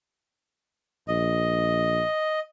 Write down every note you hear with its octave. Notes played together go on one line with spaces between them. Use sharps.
A#1 D#5